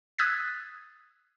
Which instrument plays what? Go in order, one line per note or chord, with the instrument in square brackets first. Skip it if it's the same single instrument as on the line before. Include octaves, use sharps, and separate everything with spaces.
[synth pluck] D#6 E6 F#6 G#6 A6 B6